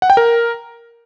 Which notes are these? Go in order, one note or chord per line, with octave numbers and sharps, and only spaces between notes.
F#5
G5
A#4